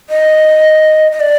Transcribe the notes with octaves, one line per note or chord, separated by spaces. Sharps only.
D#5
D#5
D5